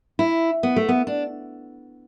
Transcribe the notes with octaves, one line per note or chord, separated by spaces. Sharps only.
E4
B3
A3
B3
D4